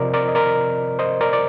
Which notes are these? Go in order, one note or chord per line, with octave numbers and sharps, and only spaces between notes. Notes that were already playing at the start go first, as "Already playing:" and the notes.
Already playing: C3 F3 C4 F4 A#4 C5 D5 D#5
A#4 D5
D#5
A#4 D5
C5 D#5
A#4 D5
D5